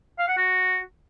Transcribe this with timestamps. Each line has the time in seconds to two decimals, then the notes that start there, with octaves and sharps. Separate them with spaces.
0.19 F5
0.28 F#5
0.37 F#4